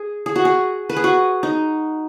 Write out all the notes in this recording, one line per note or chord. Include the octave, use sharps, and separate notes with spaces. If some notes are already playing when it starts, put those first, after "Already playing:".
Already playing: G#4
G#4
F#4
G#4
B4
G#4
F#4
D#4